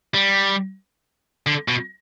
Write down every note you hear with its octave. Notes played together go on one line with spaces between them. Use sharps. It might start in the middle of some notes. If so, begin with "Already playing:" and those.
G3
D3
B2